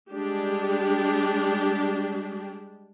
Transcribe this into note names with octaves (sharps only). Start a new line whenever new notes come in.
G3 G#3 D4 G4